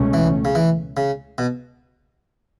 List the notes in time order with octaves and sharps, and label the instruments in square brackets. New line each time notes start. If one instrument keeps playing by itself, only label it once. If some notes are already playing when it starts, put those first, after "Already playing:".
Already playing: [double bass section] C#2 B2 A3 C#4
[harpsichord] E3
C#3
E3
C#3
B2